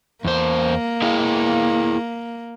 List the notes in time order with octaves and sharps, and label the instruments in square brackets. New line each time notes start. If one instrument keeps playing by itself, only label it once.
[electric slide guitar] E2 C5 [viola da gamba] A#3
[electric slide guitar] E4 G#4 F5